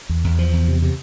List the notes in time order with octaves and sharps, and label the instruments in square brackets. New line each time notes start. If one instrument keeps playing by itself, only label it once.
[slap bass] E2
E2
F3
E2
C3
C3